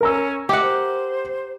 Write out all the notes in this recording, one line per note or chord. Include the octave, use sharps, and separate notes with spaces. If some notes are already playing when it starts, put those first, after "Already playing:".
C#4 A#4 A#5 E6
G4 D#5 E5 F#5 D6
C5